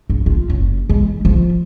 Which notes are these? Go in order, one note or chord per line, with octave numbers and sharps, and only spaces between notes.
G2
F4
F#1
E3 G#3
F3 F4